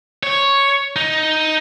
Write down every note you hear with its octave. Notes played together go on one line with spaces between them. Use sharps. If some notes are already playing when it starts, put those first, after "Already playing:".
C#5
D#4